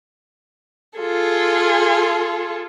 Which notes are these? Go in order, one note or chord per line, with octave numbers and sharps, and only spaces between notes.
F4 G#4 A4